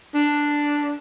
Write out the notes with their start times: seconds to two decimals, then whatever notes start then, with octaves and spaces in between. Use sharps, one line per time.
0.14 D4